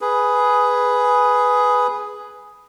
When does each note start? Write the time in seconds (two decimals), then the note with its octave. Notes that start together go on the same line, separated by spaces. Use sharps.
0.01 G#4 B4